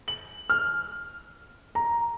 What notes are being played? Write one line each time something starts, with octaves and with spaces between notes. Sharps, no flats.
F#7
F6
A#5